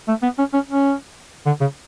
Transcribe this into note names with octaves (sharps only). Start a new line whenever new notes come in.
A3
B3
C#4
C#4
C#4
D3
C#3